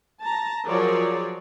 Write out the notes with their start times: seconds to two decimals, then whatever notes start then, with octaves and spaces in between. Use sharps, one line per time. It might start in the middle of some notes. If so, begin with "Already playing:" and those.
0.23 A5 A#5
0.67 F3 F#3 G#4 A#4 C#5 D5